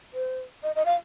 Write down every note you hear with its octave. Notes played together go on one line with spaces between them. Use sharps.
C5
D#5
D#5
F5